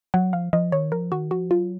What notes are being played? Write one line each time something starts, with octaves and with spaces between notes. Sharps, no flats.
F#3 F#5
F3 F5
F3 D#5
D#3 C#5
F3 A#4
D#3 F#4
F3 F#4
F#3 F4